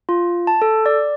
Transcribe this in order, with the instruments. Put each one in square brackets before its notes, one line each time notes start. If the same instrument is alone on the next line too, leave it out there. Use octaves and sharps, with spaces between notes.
[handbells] F4
A5
A4
D5